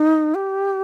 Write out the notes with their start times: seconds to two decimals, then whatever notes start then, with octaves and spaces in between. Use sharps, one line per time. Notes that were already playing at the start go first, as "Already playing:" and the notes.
Already playing: D#4
0.35 G4